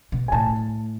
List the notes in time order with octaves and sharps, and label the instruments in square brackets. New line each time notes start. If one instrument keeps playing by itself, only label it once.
[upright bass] B2
[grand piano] G#5
[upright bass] A2 [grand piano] A5